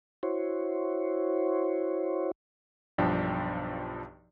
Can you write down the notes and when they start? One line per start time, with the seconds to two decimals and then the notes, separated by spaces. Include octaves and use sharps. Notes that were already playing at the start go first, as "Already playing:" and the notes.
0.23 E4 F#4 C5 C#5
2.98 B1 G2 F3 D4 G5